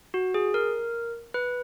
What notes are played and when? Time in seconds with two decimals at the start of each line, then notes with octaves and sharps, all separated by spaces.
0.14 F#4
0.34 G#4
0.54 A#4
1.34 B4